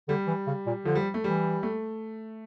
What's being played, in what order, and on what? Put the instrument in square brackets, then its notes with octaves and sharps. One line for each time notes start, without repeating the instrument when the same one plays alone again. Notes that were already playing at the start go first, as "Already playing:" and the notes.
[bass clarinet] D3 [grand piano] G3
[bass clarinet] E3
C#3
A#2
[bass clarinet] D3 [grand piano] F3
[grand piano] G3
A3
[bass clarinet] E3 [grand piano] G3
[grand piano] A3